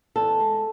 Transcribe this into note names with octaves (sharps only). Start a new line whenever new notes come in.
E2 A4
G#3